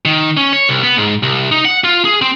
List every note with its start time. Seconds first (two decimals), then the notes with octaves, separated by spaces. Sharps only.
0.05 D#3
0.37 C#4
0.53 C#5
0.69 C2
0.83 B3
0.98 G#2
1.23 C2
1.51 D#4
1.65 F#5
1.84 F4
2.05 G#4
2.22 C4